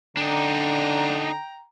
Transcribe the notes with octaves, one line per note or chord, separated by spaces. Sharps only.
D3 D4 D#4 G5 A#5